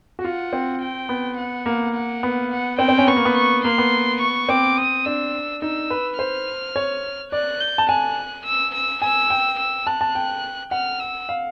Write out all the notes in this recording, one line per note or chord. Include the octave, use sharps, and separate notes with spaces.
F#4
F4 F#5
C4
G5
B3
F#5
A#3
F#5
B3
F#5
C4 G5
C4
C#4
B3 C#6
A#3
B3
C#6
A#3 C6
B3
C#6
C4 D6
D#6
D4 E6
D#4 E6
B4
C5 F6
C#5
D5 F#6
G6
A5
G#5 F#6
E6
E6
G#5 E6
G5
E6
A5 F#6
A5
G5
F#5 F6
E6
F5